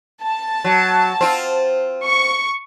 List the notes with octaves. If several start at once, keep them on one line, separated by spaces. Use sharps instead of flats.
A5
F#3
C4 F4
C#6